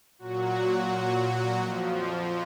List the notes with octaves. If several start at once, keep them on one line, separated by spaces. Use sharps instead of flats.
A#2 F#3 F#4
F2 F3